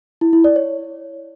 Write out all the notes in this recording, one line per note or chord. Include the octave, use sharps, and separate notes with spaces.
E4
E4
D5
C#5